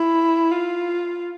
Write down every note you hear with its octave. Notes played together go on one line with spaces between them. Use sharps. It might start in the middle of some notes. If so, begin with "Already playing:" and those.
Already playing: E4
F4